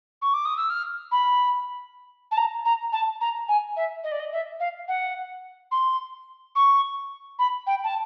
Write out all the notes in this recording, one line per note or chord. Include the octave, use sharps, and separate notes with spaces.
C#6
D6
D#6
E6
F6
B5
A5
A#5
A#5
A5
A#5
G#5
E5
D#5
D5
D#5
E5
F5
F#5
C6
C#6
B5
G5
A5